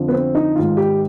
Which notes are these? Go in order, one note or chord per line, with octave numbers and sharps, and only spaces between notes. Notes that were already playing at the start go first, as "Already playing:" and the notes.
Already playing: F2 D3 F3
B3
C4
D#4
G#2 D#3 F4
G4